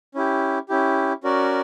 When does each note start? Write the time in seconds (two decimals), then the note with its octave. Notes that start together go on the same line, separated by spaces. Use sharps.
0.15 C#4 E4 G4
0.69 C#4 E4 G4
1.24 C#4 F#4 A#4 D5